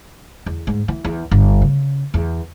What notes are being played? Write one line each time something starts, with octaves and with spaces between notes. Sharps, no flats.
E2
G#2
E3
E2
G1
C#3
E2